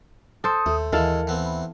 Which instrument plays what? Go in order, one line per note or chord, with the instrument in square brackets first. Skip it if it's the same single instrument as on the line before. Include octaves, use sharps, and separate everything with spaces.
[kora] A4 C5 [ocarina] D#6
[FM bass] D#2 [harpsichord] A3
[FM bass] D#2 [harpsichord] E3 G#3 [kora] E4 A4 F5 [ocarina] A#4
[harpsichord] E3 B3 C4
[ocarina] B5